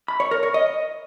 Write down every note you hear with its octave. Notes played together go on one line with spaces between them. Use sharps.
B5
C#5
A#4
C#5
D#5